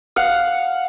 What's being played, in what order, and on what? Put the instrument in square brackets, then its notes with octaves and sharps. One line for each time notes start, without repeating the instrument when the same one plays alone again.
[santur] F5 F#5